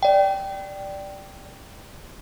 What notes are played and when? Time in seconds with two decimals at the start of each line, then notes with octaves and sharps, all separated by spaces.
0.03 D5 G5